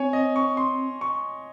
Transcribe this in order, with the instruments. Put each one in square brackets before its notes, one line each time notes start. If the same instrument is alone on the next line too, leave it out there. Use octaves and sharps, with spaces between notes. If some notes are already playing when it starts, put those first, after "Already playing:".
Already playing: [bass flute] C4 [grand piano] C#5 G#5
[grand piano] D#5
C#6
C6
C#6